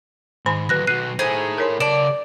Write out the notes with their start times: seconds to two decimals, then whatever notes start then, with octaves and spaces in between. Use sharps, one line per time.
0.46 G#2 D#3 G#5 B5
0.69 D2 F#3 B4 F#6 A#6
0.87 B2 F#3 F#6 C7 D#7
1.19 A3 D#4 E4 G#4 C5
1.58 A#4 C#5 C6
1.80 C#3 D5 A5 E7